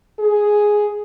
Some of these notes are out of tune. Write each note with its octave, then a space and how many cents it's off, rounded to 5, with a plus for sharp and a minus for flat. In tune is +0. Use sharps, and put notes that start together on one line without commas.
G#4 +5